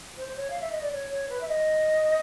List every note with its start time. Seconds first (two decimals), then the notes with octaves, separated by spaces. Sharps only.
0.17 C5
0.28 C5
0.36 C#5
0.50 F5
0.61 E5
0.71 D#5
0.82 D5
0.92 C#5
1.11 C#5
1.29 B4
1.41 E5
1.48 D#5